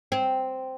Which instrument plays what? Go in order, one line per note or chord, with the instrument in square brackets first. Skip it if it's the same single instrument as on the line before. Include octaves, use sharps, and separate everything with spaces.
[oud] C4